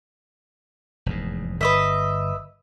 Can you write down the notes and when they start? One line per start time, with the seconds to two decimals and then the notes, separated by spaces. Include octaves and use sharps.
1.06 F1 E2 G#2
1.61 G1 B4 D#5 E5